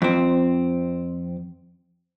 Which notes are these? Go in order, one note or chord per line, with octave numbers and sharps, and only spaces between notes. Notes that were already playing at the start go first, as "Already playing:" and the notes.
F2 C4